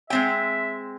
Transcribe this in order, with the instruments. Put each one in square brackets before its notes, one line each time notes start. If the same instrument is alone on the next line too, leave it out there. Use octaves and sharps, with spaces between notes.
[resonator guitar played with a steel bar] G#3 C4 G5 [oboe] E5